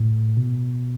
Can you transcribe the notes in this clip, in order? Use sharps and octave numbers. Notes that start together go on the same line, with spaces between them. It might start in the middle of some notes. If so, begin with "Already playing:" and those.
Already playing: A2
B2